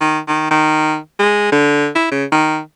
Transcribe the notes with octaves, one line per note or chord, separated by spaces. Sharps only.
D#3
D#3
D#3
G#3
D3
E4
C#3
D#3